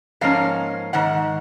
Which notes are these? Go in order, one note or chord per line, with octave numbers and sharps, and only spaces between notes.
G#2 F3 A#3 C#4 F5
G#2 D#3 F#5